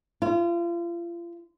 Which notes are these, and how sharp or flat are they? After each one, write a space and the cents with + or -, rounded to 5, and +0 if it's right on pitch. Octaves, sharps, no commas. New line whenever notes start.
F4 -35